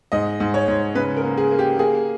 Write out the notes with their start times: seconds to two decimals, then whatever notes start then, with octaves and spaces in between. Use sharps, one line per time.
0.12 G#2 D#5
0.40 G#2
0.54 C#5
0.68 G#2
0.95 C#3 B4
1.17 A#4
1.24 A#3
1.38 G#4
1.51 A#3
1.59 G4
1.79 A#3 G#4